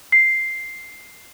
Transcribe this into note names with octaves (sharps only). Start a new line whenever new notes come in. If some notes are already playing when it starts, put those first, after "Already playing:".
C7